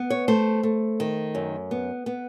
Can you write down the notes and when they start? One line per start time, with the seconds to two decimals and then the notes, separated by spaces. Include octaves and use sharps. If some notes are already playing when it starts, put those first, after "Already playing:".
Already playing: B3
0.10 C#5
0.28 A3 C5
0.63 A3
1.00 D#3
1.35 F#2
1.71 B3
2.06 B3